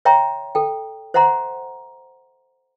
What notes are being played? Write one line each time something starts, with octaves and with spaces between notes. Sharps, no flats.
C#5 E5 G5 A#5 C6
A4 G5
C5 E5 F#5 A#5 C6